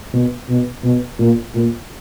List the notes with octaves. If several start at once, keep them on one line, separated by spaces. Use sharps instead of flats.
B2
B2
B2
A#2
A#2